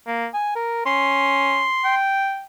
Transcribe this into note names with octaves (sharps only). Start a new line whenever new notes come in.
A#3
G#5
A#4
C#4 C6
G5